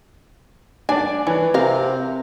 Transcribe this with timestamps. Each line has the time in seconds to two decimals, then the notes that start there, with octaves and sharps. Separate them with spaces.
0.89 D4 D5 G#5
1.27 E3 C#5
1.54 C3 A#4 F5